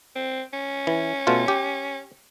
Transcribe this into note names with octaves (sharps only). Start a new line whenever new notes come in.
C4
C#4
E3
B2 A3 F4
G4